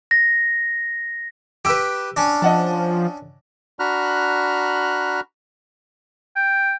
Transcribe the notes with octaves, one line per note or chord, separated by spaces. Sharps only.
A#6
G4 B4 E6 D7
C#4 D4
F3 D#5 F#5 A5
D4 F#4 A#5 B5 F6 F#6
G5